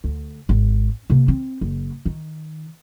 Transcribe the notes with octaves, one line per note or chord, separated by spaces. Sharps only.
D2
G#1
C3 A#3
C4
F#1
D#3